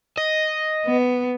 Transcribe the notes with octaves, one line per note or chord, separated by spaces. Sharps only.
D#5
B3